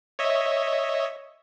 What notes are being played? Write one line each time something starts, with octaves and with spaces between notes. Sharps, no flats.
C#5 D#5 E5